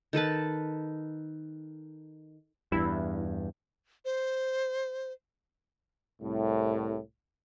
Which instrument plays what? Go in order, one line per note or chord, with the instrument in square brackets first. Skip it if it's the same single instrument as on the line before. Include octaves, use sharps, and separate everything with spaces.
[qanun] D#3 A4 B4 A5
[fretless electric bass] E2 G2 [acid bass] E4
[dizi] C5
[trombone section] C2 A2